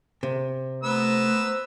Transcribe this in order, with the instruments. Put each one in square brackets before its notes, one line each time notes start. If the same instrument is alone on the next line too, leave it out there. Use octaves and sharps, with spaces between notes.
[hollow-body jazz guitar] C3
[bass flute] A3 [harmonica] B3 E6 [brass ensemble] C5 A#5